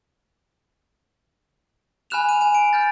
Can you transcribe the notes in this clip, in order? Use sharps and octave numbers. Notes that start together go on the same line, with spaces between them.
G#5 B5 F6 F#6 E7 F7
D#7 F7
G#5 D#7
D7
F6 G6 A6